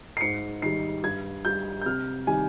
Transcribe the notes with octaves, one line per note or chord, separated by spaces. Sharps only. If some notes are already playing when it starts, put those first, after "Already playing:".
C7
G#2 C#7
D#3 G3 C7
G2 G#6
G3 G6
G6
C3 F6
D#3 G3 G#5